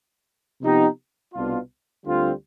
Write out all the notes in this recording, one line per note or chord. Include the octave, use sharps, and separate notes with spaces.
C3 F3 B3 D#4 G4
C2 B2 B3 D4 F4
D2 D3 G3 C4 F4